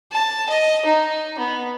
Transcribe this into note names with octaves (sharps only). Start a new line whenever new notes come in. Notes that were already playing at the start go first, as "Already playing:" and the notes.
A5
D#5
D#4
B3